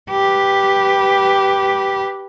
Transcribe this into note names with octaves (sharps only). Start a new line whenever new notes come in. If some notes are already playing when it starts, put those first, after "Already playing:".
G4 B4